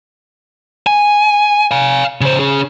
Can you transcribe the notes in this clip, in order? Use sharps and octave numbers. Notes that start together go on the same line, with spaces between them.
G#5
F5 G#5
C#3 C5
C#4 G#4